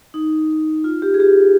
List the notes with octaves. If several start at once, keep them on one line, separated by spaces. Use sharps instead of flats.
D#4
F4
G4
G#4
G4